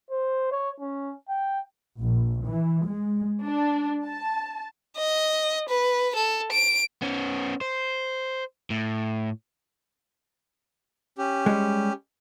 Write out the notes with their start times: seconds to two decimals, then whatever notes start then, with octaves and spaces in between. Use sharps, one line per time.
0.10 C5
0.51 C#5
0.80 C#4
1.28 G5
1.99 A#1
2.44 E3
2.87 G#3
3.42 D4
4.07 A5
4.97 D#5
5.69 B4
6.16 A4
6.52 D7
7.02 B3 C#4
7.61 C5
8.70 A2
11.18 C#4 G4
11.46 G3 G#3